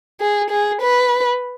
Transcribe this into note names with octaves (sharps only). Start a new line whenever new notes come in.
G#4
G#4
B4